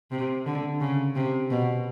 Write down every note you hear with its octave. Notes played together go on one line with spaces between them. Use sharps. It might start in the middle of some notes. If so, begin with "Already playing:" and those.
C3
D3
C#3
C3
B2